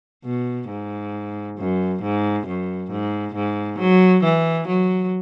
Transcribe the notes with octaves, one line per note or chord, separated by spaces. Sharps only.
B2
G#2
F#2
G#2
F#2
G#2
G#2
F#3
E3
F#3